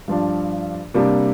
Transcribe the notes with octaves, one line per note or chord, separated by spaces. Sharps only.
G2 F3 D4
C3 G3 A#3 D4